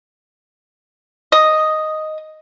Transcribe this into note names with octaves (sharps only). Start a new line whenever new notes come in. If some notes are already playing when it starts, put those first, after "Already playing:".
D#5